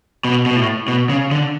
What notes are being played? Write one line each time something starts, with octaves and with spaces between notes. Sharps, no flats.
B2
B2
A2
B2
C#3
D3